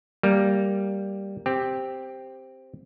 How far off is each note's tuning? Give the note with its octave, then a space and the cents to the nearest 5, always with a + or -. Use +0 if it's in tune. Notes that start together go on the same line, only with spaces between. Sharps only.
G3 +0 A#3 +0
C4 +0 G4 +5